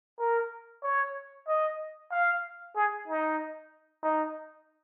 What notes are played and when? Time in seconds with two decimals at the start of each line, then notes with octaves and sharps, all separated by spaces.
0.20 A#4
0.84 C#5
1.48 D#5
2.12 F5
2.76 G#4
3.08 D#4
4.03 D#4